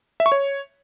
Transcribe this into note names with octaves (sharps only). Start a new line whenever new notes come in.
E5
C#6
C#5